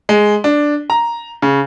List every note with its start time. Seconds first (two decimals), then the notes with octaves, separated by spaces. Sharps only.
0.09 G#3
0.44 D4
0.90 A#5
1.42 C#3